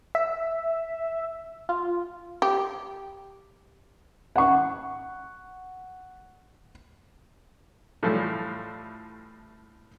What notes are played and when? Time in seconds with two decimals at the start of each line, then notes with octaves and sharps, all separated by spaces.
0.15 E5
1.69 F4
2.42 G4
4.36 F#5 C#6
8.03 A2 E3 F3 G3 A3